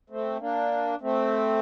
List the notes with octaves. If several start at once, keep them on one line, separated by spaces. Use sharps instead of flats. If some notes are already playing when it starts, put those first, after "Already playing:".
A3 C4
A#3 D4
A3 C4